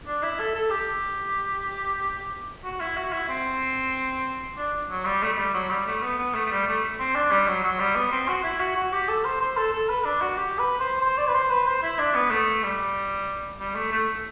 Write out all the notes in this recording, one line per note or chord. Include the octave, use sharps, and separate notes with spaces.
D4
E4
A4
A4
G4
F#4
E4
F#4
E4
C4
D4
F#3
G3
A3
A3
G3
F#3
G3
A3
B3
B3
A3
A3
G3
A3
C4
D4
G3
F#3
F#3
G3
B3
C4
F#4
E4
F#4
F#4
G4
A4
C5
C5
A4
A4
B4
D4
F#4
G4
B4
C5
C5
D5
B4
C5
B4
C5
E4
D4
B3
A3
G3
G3
A3
A3